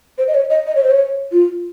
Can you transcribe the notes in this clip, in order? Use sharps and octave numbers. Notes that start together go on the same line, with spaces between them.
C5
D#5
C#5
D#5
D#5
C#5
C5
C#5
F4